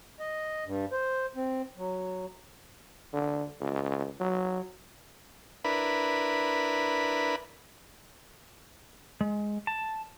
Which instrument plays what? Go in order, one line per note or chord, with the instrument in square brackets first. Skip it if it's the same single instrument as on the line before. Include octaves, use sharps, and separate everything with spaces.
[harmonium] D#5
G2
C5
C4
F#3
[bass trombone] D3
C#2
F#3
[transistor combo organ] D4 E4 A#4 B4 B5
[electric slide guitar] G#3
A5